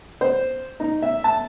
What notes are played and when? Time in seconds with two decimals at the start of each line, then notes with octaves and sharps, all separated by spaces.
0.21 C5
0.80 D#4
1.02 E5
1.24 A5